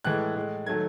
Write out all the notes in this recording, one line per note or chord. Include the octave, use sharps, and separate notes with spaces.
A2 E3 G#3 F#6
A2 G#3
D#3 F#3 A3 G#6